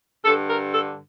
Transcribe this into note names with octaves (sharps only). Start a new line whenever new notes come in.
G2 D3 A4
A#4
A4